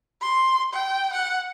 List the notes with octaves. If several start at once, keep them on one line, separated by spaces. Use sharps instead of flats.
C6
G5
F#5